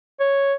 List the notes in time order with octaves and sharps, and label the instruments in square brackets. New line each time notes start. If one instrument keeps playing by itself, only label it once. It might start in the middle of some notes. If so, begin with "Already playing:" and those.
[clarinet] C#5